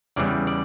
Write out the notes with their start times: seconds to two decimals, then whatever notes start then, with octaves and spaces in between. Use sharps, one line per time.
0.16 E2 C#3 E3 G3 D5
0.47 D5